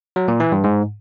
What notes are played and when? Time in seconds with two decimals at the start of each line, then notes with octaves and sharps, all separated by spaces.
0.16 F#3
0.28 A#2
0.40 E3
0.52 G2
0.64 G#2